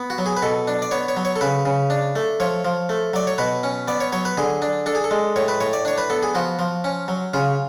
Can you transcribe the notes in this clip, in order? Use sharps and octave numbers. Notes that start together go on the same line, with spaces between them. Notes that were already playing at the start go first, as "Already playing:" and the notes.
Already playing: B3
F#4
F#3
G#4
B4
B2 A4
D4
D5
B3 C#5
C#5
F#3
C#5
A4
C#3 B4
C#3
D4
A3
F3 C#5
F3
A3
F#3 D5
C#5
B2 B4
C#4
B3 D5
C#5
F#3 C#5
B4
D3 G#4
D4
D4 A4
G#4
A4
G#3
A2 C#5
B4
A2 C#5
D5
D4 C#5
B4
B3 A4
G#4
F3 F#4
F3
C#4
F#3
C#3 F4